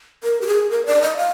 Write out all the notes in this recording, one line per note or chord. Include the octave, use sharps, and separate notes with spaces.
A#4
G4
G#4
A#4
D5
D#5
F5